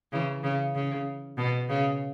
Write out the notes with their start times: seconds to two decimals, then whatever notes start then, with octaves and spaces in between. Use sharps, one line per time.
0.12 C#3 E3
0.43 C#3
0.75 C#3
1.38 B2
1.69 C#3